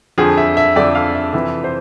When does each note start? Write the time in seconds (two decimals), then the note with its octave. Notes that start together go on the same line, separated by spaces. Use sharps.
0.18 F2 D3 F3 G#4
0.37 E5
0.57 E5
0.76 F2 D3 F3 D5
0.95 F5
1.15 E5
1.33 F2 C3 E3 E5
1.64 C5